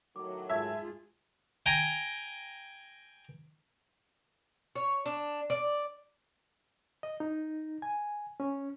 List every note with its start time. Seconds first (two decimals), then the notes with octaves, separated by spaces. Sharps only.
0.16 A2 D#3 F#3 D6
0.50 G#2 F4 G#4 E5 A5 E6 G#6
1.66 G5 G#5 A#5
4.76 C#5
5.06 D4
5.50 D5
7.03 D#5
7.20 D#4
7.82 G#5
8.40 C#4